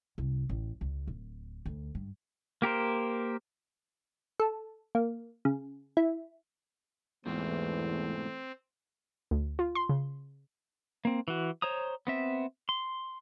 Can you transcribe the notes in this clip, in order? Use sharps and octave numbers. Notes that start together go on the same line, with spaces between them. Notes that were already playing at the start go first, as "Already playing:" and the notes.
C2
A1
C#2
D1
D2
G2
A#3 G4 A#4 C5
A4
A#3
C#3
E4
E2 G#2 B2 E3 A3 C4
D2
F4
C6
C#3
A#3 C4
E3 F#4
C5 C#5 A#5 D#6
B3 C4 E5
C6